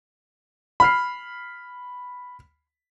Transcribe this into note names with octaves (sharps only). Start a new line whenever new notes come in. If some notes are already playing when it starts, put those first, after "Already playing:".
B5 F6 C7